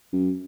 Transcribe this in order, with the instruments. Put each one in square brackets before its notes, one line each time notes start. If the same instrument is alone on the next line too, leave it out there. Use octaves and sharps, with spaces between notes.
[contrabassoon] F#2